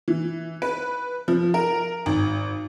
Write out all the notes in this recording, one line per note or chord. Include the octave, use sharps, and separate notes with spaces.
E3
B4
F3
A#4
G#1